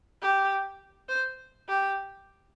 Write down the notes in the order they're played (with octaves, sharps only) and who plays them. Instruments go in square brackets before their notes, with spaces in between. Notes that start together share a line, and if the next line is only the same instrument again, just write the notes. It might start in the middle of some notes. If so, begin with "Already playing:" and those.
[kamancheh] G4
C5
G4